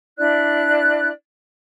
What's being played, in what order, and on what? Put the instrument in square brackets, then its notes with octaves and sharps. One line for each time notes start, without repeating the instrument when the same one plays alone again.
[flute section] D4 E4 D5 F#6